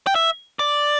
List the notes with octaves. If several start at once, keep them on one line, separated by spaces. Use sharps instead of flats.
G5
E5
D5